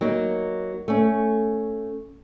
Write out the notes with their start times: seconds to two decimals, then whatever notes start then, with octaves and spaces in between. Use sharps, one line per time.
0.01 F#3 A#3 D#4
0.88 A3 C#4